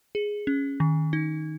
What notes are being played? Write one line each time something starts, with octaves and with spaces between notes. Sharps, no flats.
G#4
C#4
D#3
D#4